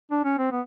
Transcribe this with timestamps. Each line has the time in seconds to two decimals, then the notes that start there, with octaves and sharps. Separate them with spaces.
0.11 D4
0.24 C#4
0.38 C4
0.52 B3